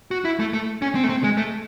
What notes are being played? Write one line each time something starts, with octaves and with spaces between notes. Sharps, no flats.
F#4
E4
A3
A3
C#4
C4
A3
C4
G#3
A3